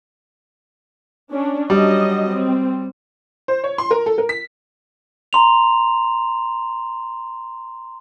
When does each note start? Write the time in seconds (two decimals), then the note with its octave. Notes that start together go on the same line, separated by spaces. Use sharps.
1.31 C#4 D4
1.70 F#3 G3 D4 D#5
2.30 C4
3.48 C5
3.64 C#5
3.78 C6
3.91 A#4
4.06 A4
4.18 A#4
4.29 B6
5.33 A#5 C6 F7